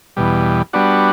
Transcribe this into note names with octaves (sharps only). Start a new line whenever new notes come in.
E2 B2 G3
G3 B3 D4 F#4